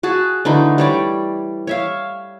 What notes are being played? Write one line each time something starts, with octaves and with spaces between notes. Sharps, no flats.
F#4 G#4 A5
D3 E3 A3 D#4
G3 C#5 D5
C#5 E5 F5